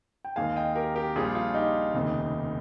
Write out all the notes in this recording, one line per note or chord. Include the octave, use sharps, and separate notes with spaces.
G5
D#2 D#3 G#3 F5 G#5
D#5 G5
G4 A#4
G4 A#4
A#1 A#2 G3 F4 G#4
F4
D#4 G4
F1 D#2 C#3